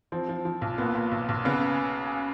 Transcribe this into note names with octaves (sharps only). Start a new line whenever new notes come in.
F3 C4
F3
F3
B1
A#2 B3
A#2
B1
B1
C#3 B3